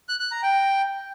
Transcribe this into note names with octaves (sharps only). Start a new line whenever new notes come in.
F#6
F#6
A#5
G5